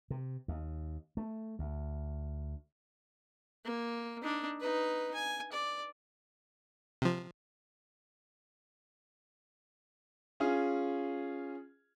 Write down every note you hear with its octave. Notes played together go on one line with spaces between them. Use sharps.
C3
D#2
A3
D2
A#3
D4 D#4
D#4 B4
G#5
D5
C3 F3
C#4 F4 G#4